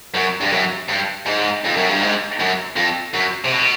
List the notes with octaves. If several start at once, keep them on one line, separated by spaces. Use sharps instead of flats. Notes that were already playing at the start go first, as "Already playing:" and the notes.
F#2
G2
F#2
G2
G#2
F2
F#2
G2
G#2
F#2
F2
F#2
C3
B2